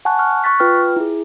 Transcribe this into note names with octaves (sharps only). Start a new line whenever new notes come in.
F#5 G#5 A5 C#6 F#6
C#6 F6 F#6
C#6 F#6 A6 B6
F4 B4 G5 F6
E4 G#4